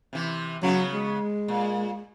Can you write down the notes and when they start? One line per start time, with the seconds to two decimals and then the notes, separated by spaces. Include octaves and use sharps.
0.13 C3 E3
0.63 C#3 F#3 B3
0.93 G#3
1.48 A#2